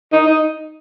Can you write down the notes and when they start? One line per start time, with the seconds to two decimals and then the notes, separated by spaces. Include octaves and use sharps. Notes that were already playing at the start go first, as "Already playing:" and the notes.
0.13 D#4
0.27 D#4